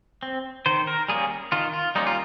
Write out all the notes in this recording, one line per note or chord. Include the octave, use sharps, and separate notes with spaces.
C4
D#3 C5
A#4
G3 A#3 C#4 G#4
D#3 F4
F4
G3 A#3 C#4 D#4
F4